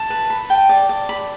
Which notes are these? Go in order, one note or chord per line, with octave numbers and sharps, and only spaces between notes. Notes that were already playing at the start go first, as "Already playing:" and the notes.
Already playing: A5
B4
B5
G5
D5
D5
B5